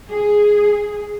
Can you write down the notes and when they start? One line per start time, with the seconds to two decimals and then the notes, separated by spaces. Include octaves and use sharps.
0.10 G#4